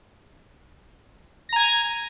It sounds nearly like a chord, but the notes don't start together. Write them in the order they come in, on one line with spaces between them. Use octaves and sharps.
A#6 A#5 G#5 G#6